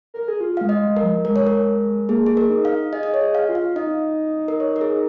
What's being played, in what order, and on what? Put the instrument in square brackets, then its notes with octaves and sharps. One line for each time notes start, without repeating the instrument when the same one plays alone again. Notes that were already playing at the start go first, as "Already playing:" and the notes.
[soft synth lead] A#4
G#4
F4
[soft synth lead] G#3 [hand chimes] F5
[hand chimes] D#5
[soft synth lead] G#3
[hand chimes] A#4
[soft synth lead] F3
[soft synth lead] G#3 [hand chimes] A#4
[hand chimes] C#5
A#4
[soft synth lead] A#3 [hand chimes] G#4
[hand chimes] G#4
A#4
[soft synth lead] D#4
[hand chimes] F5
[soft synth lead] G#4 [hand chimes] D#5
[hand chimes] D#5
C#5
[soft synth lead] G#4
[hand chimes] F5
[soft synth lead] F4
[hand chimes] F5
[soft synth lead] D#4 [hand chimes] D#5
[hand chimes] A#4
C#5
A#4
G#4